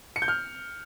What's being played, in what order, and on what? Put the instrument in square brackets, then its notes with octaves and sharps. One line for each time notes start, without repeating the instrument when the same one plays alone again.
[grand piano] C#7
G6
F6